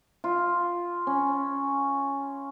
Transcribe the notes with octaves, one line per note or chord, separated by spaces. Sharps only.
F4
C#4